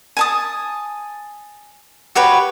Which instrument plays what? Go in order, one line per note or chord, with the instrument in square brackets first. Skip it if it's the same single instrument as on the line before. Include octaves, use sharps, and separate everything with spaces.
[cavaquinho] G#5 A5 D#6
F#4 G4 B4 C#5